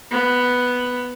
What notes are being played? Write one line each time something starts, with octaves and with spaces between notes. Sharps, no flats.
B3